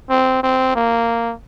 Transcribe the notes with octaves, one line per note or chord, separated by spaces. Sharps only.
C4
C4
A#3